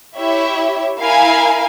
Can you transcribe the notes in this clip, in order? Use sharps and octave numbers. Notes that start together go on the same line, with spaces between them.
E4 G4 C#5 E5
E4 A#4 F5 G#5